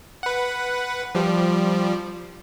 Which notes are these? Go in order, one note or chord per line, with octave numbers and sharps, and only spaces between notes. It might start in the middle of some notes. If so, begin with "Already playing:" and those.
B4 F#5
F3 G3